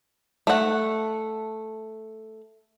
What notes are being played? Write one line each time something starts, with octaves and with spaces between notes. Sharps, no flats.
A3 F#5